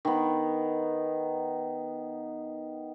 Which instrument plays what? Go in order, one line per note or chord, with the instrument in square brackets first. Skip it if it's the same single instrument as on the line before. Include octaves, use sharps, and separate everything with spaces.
[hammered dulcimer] D#3 B3